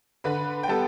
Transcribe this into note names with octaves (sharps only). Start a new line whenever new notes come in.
D3 B4 B5
G5
G3 B3 A4 A5